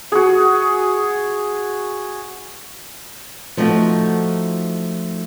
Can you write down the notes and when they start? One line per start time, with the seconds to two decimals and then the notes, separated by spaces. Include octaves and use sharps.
0.12 F#4 G#4
3.57 F3 A3 D#4 F4 F#4